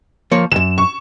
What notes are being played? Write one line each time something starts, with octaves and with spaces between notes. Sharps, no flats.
F3 A#3 C#5
C#2 F#2 E7
C#6